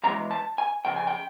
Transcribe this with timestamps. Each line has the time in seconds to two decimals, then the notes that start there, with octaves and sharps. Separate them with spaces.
0.03 D#2 C#3 E3 G#3 A#5
0.31 A5
0.58 G#5
0.85 F2 C#3 G5
0.96 G#5
1.07 G5